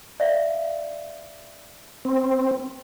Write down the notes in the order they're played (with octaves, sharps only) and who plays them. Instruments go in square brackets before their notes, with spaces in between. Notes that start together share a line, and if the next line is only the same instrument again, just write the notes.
[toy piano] D5 E5 F5
[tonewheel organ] C4